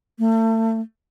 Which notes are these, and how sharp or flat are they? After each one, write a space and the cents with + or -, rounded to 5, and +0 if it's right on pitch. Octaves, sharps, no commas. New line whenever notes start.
A3 +35